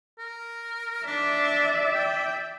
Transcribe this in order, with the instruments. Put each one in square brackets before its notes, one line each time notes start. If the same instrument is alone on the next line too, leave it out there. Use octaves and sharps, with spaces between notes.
[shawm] A#4
[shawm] D4 [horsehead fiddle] D5 E5
[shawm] G5